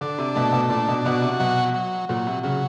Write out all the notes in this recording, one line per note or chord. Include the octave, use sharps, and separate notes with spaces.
D3 D4
C3
B2 A3
B2
A#2 D4
B2
B2 F#4
C3
B2 F#3
F#3
A#2 F#3
C3
C#3 F#3